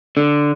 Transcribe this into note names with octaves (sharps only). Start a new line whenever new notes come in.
D3